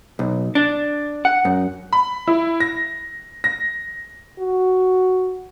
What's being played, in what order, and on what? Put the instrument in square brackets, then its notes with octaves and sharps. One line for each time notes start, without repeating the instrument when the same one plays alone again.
[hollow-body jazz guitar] B1
D4
F#5
F#2
[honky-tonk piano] B5
E4
A#6
A#6
[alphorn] F#4